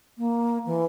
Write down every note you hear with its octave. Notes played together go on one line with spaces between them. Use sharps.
A#3
E3